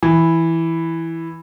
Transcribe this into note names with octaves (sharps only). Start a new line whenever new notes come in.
E3